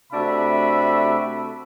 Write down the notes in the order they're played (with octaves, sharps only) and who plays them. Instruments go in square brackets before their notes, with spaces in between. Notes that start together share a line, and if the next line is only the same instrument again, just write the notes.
[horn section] C3 A3 D4 F#4 E5 B5